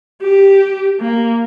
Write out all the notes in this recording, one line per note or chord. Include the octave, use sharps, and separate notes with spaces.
G4
A#3